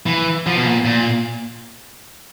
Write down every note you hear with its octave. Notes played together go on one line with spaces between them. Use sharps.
E3
F3
B2
A#2
A#2